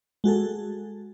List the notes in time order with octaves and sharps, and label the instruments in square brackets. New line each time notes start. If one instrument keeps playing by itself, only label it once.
[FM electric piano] G#3 F#4 G#4 A4